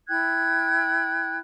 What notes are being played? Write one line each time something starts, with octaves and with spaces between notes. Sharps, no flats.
E4 G5 F#6 G#6